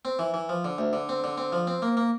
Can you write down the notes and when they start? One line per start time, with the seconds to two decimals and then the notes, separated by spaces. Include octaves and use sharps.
0.05 C4
0.19 E3
0.34 E3
0.49 F3
0.64 D3
0.78 D2
0.93 D3
1.09 C4
1.24 D3
1.38 C4
1.52 F3
1.67 C4
1.82 A#3
1.97 A#3